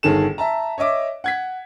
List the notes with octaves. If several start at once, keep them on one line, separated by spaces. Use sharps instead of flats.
G1 D#3 G#4 A4 E7
E5 A5 A#5
C#5 D#5 E5 D6
F#5 G#6 B6